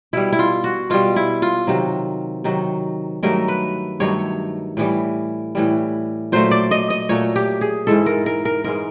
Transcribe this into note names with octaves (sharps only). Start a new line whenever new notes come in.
B2 G3 E4
E4
F4
F#4
B2 G3 F4
E4
F4
C3 D#3 F#3
C3 D#3 F#3
G2 D#3 F#3 A3 A#4
B4
G2 D#3 F#3 A3 C#5
A2 E3 G3
A2 E3 G3
A#2 F#3 A3 C5
D5
D#5
D#5
A#2 F#3 A3 C#5
G4
G#4
G#2 E3 G#3 A4
A#4
A#4
A#4
G#2 E3 G#3 A#4